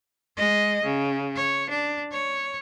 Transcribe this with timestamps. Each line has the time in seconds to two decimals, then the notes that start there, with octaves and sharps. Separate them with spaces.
0.36 G#3 D#5
0.83 C#3
1.36 C#5
1.70 D4
2.12 C#5